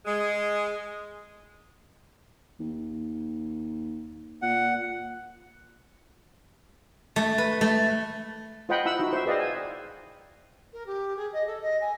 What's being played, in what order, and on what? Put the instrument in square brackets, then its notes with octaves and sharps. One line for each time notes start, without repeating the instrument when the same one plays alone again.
[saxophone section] G#3
[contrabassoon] D#2
[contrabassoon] A#2 [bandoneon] F#5
[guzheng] A3
B4
A3
[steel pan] F4 C5 D#5 F#5 G5 B5
E4 F#5 B5 E6
D#4 E4 F#4
C5 E5
G#4 B4 D5 D#5 F5 G5
G#5
[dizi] A#4
G4
G#4
D#5
A4
D#5
G#5